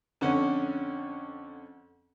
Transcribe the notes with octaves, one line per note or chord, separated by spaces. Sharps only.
F2 D3 C#4 F#5